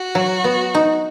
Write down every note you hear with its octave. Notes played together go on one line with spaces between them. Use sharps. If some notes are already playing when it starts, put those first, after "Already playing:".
Already playing: F#4
F#3
B3
D#4